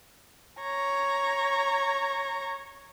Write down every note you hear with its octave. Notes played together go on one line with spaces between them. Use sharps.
C#5 A#5